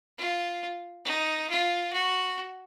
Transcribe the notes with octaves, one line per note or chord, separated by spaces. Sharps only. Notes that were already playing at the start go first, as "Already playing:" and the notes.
F4
D#4
F4
F#4